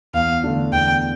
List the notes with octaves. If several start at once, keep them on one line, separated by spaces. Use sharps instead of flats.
E2 F5
D3 A3 D4
E2 G5